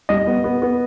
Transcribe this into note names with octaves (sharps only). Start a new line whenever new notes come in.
G3 D#5
B3
B3
B3